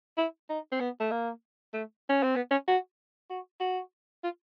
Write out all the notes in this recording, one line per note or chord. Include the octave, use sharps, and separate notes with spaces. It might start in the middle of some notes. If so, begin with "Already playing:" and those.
E4
D#4
C4
B3
A3
A#3
A3
C#4
C4
B3
C#4
F#4
F#4
F#4
F4